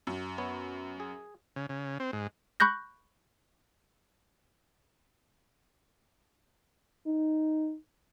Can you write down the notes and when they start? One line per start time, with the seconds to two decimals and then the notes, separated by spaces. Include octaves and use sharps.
0.07 F#2
0.38 B3 C#5
1.00 G#4
1.56 C#3
1.69 C#3
2.00 C4
2.13 G#2
2.60 B5 C#6 F#6 G6 A#6
7.06 D#4